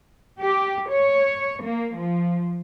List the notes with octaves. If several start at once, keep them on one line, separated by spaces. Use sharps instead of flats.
G4
C#5
A#3
F3